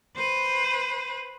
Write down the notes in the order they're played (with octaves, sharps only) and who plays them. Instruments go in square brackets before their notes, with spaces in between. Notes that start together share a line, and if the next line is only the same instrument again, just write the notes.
[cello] B4 C5